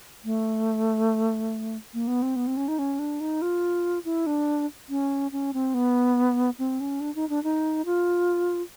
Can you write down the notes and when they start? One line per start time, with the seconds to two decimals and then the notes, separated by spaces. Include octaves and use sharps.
0.24 A3
1.94 A#3
2.07 B3
2.22 C4
2.36 B3
2.47 C4
2.57 C#4
2.68 D#4
2.79 C#4
2.99 D4
3.20 D#4
3.42 F4
4.05 E4
4.26 D4
4.89 C#4
5.32 C#4
5.53 C4
5.74 B3
6.59 C4
6.80 C#4
7.00 D4
7.15 D#4
7.29 D4
7.44 D#4
7.85 F4